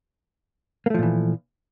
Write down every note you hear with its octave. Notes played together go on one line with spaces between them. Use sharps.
A#2 E3 F3 A3 A#3